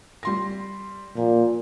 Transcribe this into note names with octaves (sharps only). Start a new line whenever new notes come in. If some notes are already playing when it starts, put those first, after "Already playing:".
G3 C6 A#6
A#2 F3